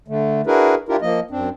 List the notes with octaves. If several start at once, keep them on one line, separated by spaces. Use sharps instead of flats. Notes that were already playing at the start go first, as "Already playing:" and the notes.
D3 A3
D4 E4 F#4 G#4 A#4 B4
D4 E4 F4 G4 A#4
F3 A#3 D#5
F#2 C4 D4